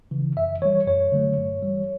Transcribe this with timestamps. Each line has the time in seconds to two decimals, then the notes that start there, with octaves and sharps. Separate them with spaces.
0.11 C#3 E3
0.36 F#2 E5
0.62 E3 G3 C#5
0.86 F#2 C#5
1.12 D3 F#3 A3
1.38 G2
1.63 E3 G3